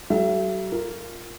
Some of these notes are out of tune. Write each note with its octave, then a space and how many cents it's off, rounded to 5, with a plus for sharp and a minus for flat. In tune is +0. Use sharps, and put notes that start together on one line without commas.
F#3 +40 A4 -35 E5 +35
F4 +0 A#4 -5